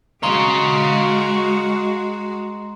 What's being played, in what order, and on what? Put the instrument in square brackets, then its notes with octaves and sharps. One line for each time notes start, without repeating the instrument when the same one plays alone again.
[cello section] G#3 F#4 [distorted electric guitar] C#5 F5 [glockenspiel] A#5 C6